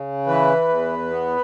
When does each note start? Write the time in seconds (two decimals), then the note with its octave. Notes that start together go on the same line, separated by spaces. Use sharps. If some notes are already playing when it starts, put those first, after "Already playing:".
Already playing: C#3
0.27 E3 B4
0.68 E2
1.10 B3